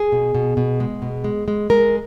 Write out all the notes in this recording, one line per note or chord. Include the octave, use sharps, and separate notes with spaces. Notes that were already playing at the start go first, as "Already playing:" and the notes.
Already playing: G#4
B2
B2
B2
G#3
B2
G#3
G#3
G#3 A#4